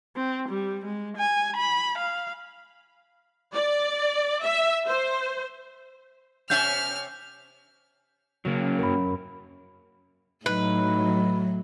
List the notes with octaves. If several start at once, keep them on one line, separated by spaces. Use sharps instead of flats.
C4
G3
G#3
G#5
B5
F5
D5
E5
C5
C3 C#4 E5 F6 G6
C#3 F#3 A#3
F#2 A#4 B5
A2 F#3 D#4 B4